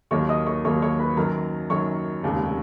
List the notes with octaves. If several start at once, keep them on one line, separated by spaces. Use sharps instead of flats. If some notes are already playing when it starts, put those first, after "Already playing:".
D#2 D#3 F#3 A#3 C#5 C#6
D#5 D#6
C#5 C#6
D#2 D#3 F#3 A#3 C#5 C#6
C#5 C#6
B4 B5
F#2 D#3 F#3 A#4 A#5
F#2 D#3 F#3 C#5 C#6
F1 D#2 C#3 G#3